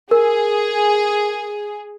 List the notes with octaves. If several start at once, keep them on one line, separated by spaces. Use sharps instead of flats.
G#4 A#4